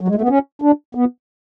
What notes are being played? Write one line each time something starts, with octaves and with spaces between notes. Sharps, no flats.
F#3
G#3
A3
B3
C#4
D4
B3